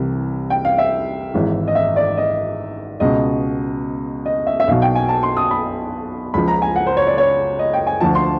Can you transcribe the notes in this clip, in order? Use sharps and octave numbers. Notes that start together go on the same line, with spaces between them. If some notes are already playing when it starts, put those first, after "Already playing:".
Already playing: C2 C3 E3
G5
F5
E5
G#1 G#2 E3
D#5
E5
D5
D#5
C#2 B2 D#5
D#5
E5
E5
B1 B2 F5
G5
G#5
A5
C6
D#6
B5
C#2 C#3 F3 B5
A#5
G#5
F#5
C5
C#5
D5
C#5
D#5
G5
G#5
D2 D3 F3 A5
C6